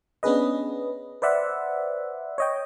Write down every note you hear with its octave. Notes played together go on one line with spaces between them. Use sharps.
B3 C#4 D4 G#4 B4 D#5
B4 C5 D5 E5 F#5
C#5 D#5 G5